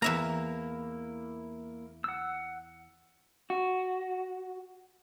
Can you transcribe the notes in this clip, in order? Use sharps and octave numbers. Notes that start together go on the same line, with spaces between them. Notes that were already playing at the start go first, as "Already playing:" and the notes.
E2 A#3 E4 E5 A#5
F#5 E6
F#4